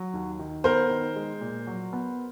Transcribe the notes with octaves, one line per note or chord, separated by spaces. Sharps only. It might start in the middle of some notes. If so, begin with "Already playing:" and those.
Already playing: F#3
D#2
D#3
B3 A#4 C5
D#3
G#3
A#2
F#3
B3